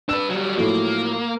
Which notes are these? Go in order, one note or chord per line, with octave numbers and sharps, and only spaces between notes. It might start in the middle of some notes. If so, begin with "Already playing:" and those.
D4 B4 E6 E7
F#3 G3
A2 F3 F#3 A#3